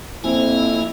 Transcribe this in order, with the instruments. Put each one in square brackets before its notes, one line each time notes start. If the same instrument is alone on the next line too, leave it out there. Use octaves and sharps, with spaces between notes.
[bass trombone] F2 [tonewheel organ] A#3 F4 G#5 [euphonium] C4 [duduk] E4